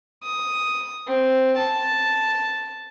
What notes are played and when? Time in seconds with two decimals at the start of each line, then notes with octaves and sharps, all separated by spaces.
0.23 D#6
1.07 C4
1.57 A5